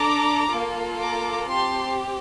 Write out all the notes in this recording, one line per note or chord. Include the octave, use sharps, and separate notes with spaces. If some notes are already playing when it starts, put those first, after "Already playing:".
Already playing: D4 A4 A#5 D6
A#3 F4 A4
A#5 D6
C4 G4 A5 C6